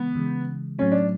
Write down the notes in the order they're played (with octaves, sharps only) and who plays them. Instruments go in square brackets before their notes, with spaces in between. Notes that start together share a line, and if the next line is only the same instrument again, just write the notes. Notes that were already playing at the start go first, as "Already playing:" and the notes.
Already playing: [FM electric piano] C#3 E3 G#3 [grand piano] B3
[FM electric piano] C#3 E3 G#3
[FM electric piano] A2 F#3 A3 C4 [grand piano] C#4
[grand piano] D4